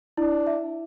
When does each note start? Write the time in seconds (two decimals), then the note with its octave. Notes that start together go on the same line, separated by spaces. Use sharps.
0.17 D4 E4
0.47 E5